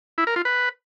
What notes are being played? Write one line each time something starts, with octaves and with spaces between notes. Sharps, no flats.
E4
A#4
F4
B4